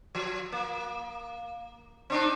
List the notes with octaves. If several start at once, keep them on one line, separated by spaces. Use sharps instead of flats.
F3
A#3
C4 D4 D#4